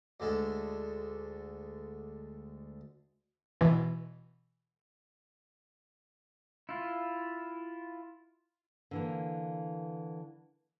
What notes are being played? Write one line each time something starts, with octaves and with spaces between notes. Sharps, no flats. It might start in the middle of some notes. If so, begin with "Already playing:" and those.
D2 D3 G#3 A4
B2 E3
E4 F4
D3 E3 A#3